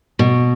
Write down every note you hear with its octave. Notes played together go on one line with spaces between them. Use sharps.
B2